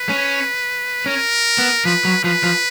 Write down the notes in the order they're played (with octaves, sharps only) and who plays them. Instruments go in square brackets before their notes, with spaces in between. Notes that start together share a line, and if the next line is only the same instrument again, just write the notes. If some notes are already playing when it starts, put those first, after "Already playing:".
Already playing: [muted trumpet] B4
[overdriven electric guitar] C#4
[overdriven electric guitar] C#4 [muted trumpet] A#4
[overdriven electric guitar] B3
[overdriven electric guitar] F3 [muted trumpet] B4
[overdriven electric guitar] F#3
[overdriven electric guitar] F3 [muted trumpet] B4
[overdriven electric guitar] F3